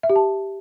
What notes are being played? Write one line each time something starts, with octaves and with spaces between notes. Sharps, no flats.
E5
G4
A5